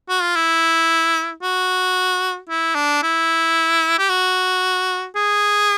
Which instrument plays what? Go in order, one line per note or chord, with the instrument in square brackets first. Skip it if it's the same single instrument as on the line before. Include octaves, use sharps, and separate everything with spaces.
[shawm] F#4
F4
E4
F#4
E4
D4
E4
G4
F#4
G#4